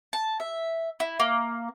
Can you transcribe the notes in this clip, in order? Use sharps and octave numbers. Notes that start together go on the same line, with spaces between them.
A5
E5
E4
A#3